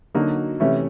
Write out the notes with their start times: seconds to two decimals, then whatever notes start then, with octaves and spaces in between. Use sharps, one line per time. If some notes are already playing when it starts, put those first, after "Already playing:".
0.15 D3 F#3 A#3 D#4 F#4
0.60 C3 E3 A3 C#4